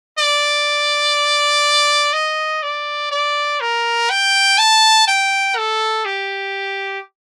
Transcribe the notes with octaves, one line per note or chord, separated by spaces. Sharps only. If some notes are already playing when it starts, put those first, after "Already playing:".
D5
D#5
D5
D5
A#4
G5
A5
G5
A4
G4